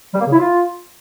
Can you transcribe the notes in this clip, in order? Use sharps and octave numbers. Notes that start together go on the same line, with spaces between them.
G3
A#3
C#3
E4
F4